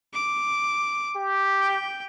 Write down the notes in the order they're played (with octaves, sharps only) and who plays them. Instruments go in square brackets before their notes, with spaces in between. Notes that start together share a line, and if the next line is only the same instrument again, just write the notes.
[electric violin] D6
[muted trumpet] G4
[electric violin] G5